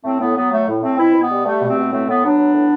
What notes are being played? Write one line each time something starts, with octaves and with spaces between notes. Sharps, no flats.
A2 A3 C4
A2 B3
F#3 B3
F#3 A3
A2
A2 A3 C4
B2 C4 E4
B2
B3
G3
G3 A3
B2
A3 C4
B2
A2 A3 C4
A2 B3
F#3 B3 D4
F#3
A2